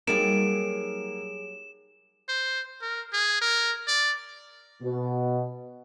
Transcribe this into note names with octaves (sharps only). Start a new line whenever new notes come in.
F#3 G3 A#3 D#4 G#4 D7 E7
C5
A#4
G#4
A#4
D5
B2